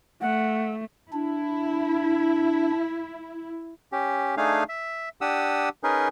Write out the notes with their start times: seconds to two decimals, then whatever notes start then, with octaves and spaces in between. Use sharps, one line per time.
0.21 A3 F#5
1.13 D4 E4
3.92 C#4 G4
4.37 A3 D4 D#4 G#4 F5 G#5
4.69 E5
5.21 D4 G4 F#5 D#6 E6
5.83 C#4 D#4 G#4 A#4 B4